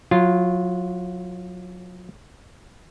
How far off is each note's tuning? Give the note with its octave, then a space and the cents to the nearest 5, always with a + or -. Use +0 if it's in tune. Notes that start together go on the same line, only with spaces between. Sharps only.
F#3 -35 F4 -10